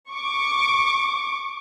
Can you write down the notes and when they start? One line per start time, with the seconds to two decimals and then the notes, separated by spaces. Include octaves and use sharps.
0.12 C#6 D6